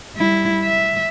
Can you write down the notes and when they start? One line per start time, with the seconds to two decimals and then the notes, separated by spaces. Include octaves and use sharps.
0.15 G3 E4
0.65 E5